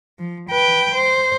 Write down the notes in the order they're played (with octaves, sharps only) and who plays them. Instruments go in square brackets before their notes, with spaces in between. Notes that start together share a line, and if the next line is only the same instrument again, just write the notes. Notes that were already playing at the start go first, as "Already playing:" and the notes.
[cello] F3
B4 G5
C5